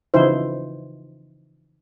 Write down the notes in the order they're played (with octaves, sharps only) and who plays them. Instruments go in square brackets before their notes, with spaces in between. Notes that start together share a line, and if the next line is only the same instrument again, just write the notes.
[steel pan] C#3 E3 F3 D#4 E4 C5